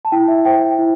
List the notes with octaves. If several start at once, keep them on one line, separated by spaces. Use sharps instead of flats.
A5
E4 G5
E5
C5 G5
G5
E4